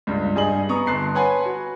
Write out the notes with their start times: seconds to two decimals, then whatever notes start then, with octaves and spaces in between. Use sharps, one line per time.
0.07 C#2 G2
0.36 G2 G#4 D#5 F#7
0.69 B3 A#5 C#6 D#6
0.87 G1 A5 C6 F#6 C7
1.15 B4 C#5 F#5 G#5 A5 C6
1.46 F#4